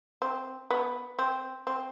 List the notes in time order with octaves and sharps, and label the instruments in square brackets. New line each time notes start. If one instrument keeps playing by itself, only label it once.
[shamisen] C4
B3
C4
C4